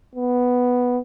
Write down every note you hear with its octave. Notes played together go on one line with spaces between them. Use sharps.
B3